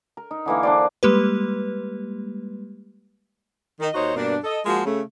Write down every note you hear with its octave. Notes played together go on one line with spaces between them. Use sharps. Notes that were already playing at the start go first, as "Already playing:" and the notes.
A#4
D#4
D3 E3 A#3
D4 C5 D5
G3 G#3 A#3 G4 B4
D#3 D#5
D#2 D#4 F#4 C5 C#5 D#5
G2 B2 A#3 D4
A4 D#5
F3 G#3 A#3 F4 F#4
C#3 A3